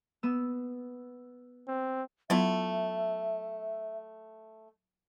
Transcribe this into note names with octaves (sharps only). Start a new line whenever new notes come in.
B3 E6
C4
F#3 A3 B3 E4 F4 E5